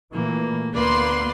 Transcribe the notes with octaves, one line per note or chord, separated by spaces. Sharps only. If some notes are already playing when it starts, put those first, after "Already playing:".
A#2 E3 A3 A#3
D2 A#3 B3 B4 D5 C6